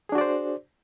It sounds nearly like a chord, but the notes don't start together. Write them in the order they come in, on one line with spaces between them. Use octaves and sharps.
G#4 D4 F#4 D5 C5